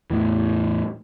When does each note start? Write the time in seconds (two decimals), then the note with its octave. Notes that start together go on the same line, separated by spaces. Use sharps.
0.10 E2 A2 E3